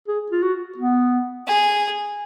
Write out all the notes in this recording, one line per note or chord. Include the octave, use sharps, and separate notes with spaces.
G#4
F4
F#4
B3
G#4